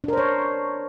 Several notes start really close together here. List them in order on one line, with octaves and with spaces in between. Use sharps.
D4 A#4 C5 C#5